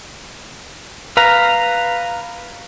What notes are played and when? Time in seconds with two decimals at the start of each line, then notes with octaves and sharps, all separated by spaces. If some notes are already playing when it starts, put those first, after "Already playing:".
1.17 B4 F5 A#5